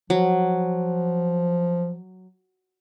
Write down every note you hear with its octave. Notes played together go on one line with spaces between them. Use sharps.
F3 F#3